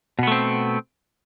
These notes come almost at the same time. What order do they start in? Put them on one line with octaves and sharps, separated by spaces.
B2 B3 A3 C4